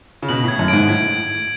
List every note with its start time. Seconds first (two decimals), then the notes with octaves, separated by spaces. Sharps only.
0.22 C#3
0.29 B2 F#7
0.44 A2 G#6
0.59 F#2
0.68 G#2 D7
0.89 A2 G#6